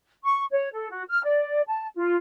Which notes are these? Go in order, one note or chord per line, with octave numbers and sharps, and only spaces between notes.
C#6
C#5
A4
F#4
F6
D5
A5
F4